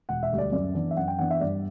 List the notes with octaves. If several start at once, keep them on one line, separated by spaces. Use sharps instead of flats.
E1 F#5
E5
D2 D3 G3
D5
F#2 D5
E3 B3 D4
E5
F#2 F#5
G5
E3 B3 D4 F#5
E5
G2 D5